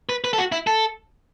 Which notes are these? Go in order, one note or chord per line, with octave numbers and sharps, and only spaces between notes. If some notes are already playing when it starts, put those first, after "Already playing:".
B4
B4
A4
F#4
E4
A4